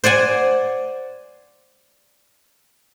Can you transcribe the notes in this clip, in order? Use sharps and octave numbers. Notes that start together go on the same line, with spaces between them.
C5 D5 F#5 G#5